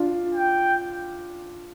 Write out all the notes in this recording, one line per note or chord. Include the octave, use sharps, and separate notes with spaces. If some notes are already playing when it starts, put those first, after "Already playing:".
Already playing: D4 F4
G5